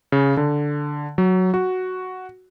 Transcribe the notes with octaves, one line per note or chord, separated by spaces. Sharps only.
C#3
D3
F#3
F#4